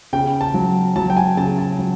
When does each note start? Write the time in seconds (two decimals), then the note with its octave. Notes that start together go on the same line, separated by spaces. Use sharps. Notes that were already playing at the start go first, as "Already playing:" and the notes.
0.13 C#3 G5
0.41 A5
0.54 F#3
0.96 F#3 A5
1.10 G5
1.17 G#5
1.37 C#3 A5
1.58 A5
1.79 F#3